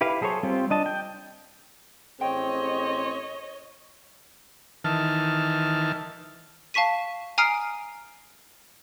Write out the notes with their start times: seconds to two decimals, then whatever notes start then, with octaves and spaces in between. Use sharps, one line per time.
0.01 E4 G4 B4 F5
0.21 F#3 G#4 A4 C5 C#5
0.43 G3 C4 F4
0.70 D4 D#5 A5
0.86 G5
2.21 A1 C4 G#4 C#5 D#5 G5
4.84 D#3 E3 A5 F6
6.74 F5 A5 C#6 B6 D#7
7.38 G#5 A#5 D#6 F6 C7 D7